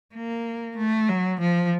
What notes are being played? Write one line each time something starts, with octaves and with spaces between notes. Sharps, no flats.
A#3
A3
F#3
F3